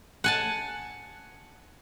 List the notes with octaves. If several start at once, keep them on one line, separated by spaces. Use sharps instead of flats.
F#5 G#5 A5